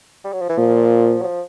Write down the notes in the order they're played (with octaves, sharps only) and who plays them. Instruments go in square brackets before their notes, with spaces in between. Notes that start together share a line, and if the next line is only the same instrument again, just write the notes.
[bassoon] G3
F#3
F3
E3
[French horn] A#2 [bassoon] F3
[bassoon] F#3
F3